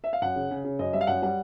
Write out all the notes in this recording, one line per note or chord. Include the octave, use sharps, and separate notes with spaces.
E5
F5
F#2 F#5
C#3
C#3
C#3
F#2 D#5
G3 E5
F5
F#2 F#5
G3 F#5